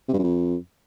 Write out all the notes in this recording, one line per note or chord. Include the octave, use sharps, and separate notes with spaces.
C3
G2
F#2
F2